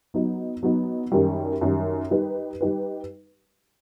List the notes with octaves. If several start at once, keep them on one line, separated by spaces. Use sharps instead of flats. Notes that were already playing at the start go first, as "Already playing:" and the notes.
F#3 B3 D#4
F#3 B3 D#4
F#2 D#3 G3
F#2 D#3 G3
G3 D#4 G4 B4
G3 D#4 G4 B4